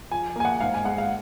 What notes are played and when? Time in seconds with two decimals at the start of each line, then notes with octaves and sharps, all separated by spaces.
0.11 F3 G#5
0.36 A#3 G#5
0.45 F#5
0.60 G#2 F5
0.74 G#5
0.85 G#3 F#5
0.98 F5